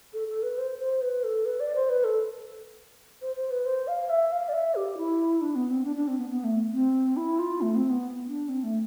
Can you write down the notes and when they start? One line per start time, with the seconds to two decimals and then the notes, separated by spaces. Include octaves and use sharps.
0.14 A4
0.28 A4
0.43 B4
0.58 C5
0.79 C5
1.01 B4
1.24 A4
1.45 B4
1.60 D5
1.75 C5
1.89 B4
2.04 A4
3.22 C5
3.36 C5
3.51 B4
3.65 C5
3.87 F5
4.09 E5
4.32 F5
4.49 D5
4.53 E5
4.75 G4
4.97 E4
5.41 D4
5.55 B3
5.71 C4
5.85 D4
5.96 D4
6.08 C4
6.18 B3
6.30 B3
6.44 A3
6.73 C4
7.17 E4
7.39 F4
7.61 A3
7.75 C4
7.90 B3
8.27 D4
8.49 C4
8.63 A3